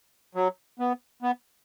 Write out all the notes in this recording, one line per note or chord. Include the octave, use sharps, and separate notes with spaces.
F#3
B3
B3